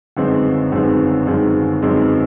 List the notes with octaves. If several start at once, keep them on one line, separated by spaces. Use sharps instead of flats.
G1 F#2 D#3 G#3 C4
G1 F#2 D#3 G#3 C4
G1 F#2 D#3 G#3 C4
G1 F#2 D#3 G#3 C4